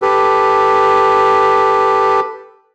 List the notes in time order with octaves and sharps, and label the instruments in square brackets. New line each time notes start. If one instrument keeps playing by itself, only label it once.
[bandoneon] G4 A4 B4